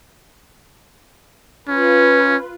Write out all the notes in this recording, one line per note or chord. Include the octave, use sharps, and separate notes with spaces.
C#4 F4 B4